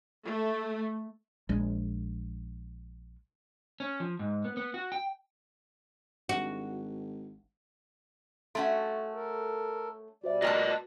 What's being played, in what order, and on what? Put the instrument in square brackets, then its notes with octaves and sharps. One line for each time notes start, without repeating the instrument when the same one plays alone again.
[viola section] A3
[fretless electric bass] A#1 G#3
[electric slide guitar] C#4
F3
G#2
B3
B3
F#4
G5
[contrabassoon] G#1 [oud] F#4
[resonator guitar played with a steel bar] A3 C#4 F#4 [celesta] F#5 A5 C6
[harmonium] A4 A#4
[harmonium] B2 G3 D5 [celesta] F#4 C5 E5
[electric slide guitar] F4 B4 D#5 [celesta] F#4 [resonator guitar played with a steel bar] A#4 G#5 A5